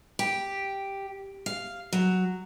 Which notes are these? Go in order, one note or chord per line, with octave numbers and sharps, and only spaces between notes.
G4
F5
F#3